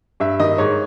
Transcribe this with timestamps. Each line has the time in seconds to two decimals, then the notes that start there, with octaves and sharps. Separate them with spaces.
0.20 G2 E5
0.40 D#3 D#5
0.58 G#2 C#5